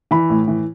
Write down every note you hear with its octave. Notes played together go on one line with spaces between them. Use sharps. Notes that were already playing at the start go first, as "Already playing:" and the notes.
E3 B5
A2
E3